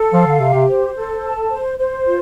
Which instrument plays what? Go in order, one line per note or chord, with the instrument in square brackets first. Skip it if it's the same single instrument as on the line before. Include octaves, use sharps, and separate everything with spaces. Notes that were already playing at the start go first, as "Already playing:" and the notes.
Already playing: [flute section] A4
[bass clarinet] F3 [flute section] F5
[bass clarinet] D3
[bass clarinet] C3 [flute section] G4
[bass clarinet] C3
[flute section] C5
A4
A5
C5
C5
F4